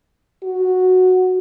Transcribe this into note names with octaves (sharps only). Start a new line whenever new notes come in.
F#4